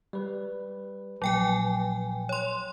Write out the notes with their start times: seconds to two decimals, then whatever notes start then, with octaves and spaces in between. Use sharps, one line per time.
0.13 G3 B4
1.22 A#1 A#2 F3 F#3 G5 G#5
2.29 C#5 C6